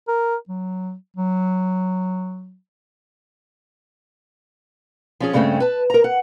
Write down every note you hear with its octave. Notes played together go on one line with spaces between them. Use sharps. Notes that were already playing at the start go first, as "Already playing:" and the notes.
A#4
F#3
F#3
F3 C#4 G#4
G2 C#3 G#3 A3 C4 G#5
B4 A5
A#4 A#5
F#5